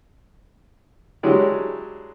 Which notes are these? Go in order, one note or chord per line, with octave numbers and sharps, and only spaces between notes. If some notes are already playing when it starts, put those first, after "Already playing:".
F#3 G#3 D4 E4 G4